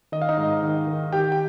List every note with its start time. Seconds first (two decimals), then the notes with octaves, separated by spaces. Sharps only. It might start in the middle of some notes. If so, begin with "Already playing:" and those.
0.12 D#3 D#5
0.22 F5
0.29 D#4 D#5
0.38 G#2
0.62 D#3
0.87 D#3
1.13 D#3 G4 G5
1.32 G5